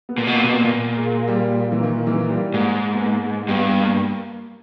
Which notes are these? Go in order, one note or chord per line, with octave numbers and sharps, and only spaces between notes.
B3
A#2 A#3
B2
A#2
B2 B3
A#2
A#2 A#3
G#3
G3
E3
D#3
E3
G3
G#2 A#3
B3
A#3
G2 B3
A#3